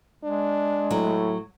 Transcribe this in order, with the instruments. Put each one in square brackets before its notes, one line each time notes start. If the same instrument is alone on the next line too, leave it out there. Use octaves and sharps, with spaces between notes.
[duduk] G#3 [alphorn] D4
[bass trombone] A2 [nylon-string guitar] F#3